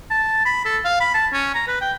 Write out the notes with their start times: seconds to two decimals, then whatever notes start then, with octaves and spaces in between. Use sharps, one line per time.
0.10 A5
0.46 B5
0.65 A4
0.85 F5
1.00 B5
1.14 A5
1.33 C#4
1.55 A#5
1.68 B4
1.81 G5